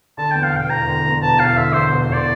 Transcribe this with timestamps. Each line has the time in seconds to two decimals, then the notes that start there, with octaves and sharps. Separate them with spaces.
0.18 D3 A5
0.31 E2 G5
0.43 F5
0.53 E1 G5
0.70 E1 A#5
0.88 D3
1.05 E2
1.22 E1 A5
1.40 E1 F5
1.56 D3 E5
1.74 E2 C5
1.92 E1
2.00 C5
2.09 E1 D5